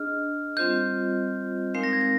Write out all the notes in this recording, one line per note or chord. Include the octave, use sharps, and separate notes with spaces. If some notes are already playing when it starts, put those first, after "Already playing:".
Already playing: D4 G#4 D#5 F6
G3 C4 F4 C5 D#5 G6
G#3 C4 D#4 A#4 F5 C7
A#6
G#6
A#6